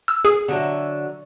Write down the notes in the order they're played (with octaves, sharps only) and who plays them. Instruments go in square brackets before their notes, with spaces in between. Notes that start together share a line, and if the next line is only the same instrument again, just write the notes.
[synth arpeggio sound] E6
G#4
[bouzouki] D3 F#3 E5